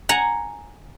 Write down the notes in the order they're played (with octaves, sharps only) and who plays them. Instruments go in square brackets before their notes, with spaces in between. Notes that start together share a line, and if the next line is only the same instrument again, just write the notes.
[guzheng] F#5 G#5 A#5